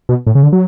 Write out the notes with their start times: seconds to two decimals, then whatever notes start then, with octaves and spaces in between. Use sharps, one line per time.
0.09 B2
0.27 A2
0.35 C#3
0.43 D3
0.53 F#3